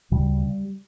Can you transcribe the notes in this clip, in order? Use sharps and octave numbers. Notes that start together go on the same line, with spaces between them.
D2 C#3 G3